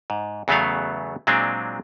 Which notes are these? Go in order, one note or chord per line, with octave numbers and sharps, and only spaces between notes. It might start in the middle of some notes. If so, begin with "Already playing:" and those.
G#2
E2 C#3 F#3 A3 B3 F5
A#2 F#3 G#3 C4 D4